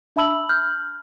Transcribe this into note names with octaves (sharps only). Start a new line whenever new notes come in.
D4 E5 A5 B5 E6 F#7
F6 G6